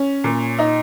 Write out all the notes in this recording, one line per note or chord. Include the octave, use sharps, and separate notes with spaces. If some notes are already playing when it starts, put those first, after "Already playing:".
Already playing: C#4
A#2
D#4